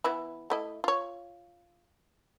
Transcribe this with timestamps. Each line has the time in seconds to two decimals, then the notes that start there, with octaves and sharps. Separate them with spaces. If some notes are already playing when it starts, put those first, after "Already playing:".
0.04 E3 B3 E4
0.50 A3 E4 D#5
0.84 F4 C#5